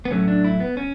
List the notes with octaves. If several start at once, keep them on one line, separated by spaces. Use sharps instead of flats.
B3
A2 F#3 A3 C#4
D4
E4
B3
C#4